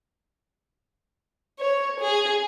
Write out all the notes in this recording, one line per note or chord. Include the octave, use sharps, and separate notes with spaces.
C#5
G#4